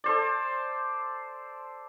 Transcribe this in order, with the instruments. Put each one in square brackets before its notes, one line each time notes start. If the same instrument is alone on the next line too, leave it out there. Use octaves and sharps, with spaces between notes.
[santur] A4 C5 D5